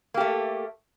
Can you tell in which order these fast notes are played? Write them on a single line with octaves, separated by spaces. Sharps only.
A#3 G4 A3